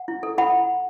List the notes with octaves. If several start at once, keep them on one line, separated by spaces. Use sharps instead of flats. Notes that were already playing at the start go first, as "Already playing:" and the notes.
Already playing: F#5
E4
A4
E4 F#5 B5